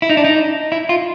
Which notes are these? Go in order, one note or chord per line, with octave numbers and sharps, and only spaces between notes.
E4
D#4
D4
D#4
E4
F4